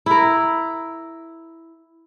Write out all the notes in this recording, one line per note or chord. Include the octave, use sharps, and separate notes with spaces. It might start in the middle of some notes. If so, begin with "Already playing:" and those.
E4 A#4